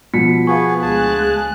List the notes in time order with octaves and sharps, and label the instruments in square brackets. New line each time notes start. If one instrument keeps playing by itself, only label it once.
[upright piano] B2 F3 B6 [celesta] C#7
[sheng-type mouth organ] B3 G#4 [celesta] F5 C#6
[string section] D2 G#3 F#6 [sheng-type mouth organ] G#4 A5